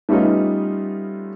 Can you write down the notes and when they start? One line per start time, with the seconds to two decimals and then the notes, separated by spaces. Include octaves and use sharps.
0.09 G3 A3 B3 C#4 D#4 F4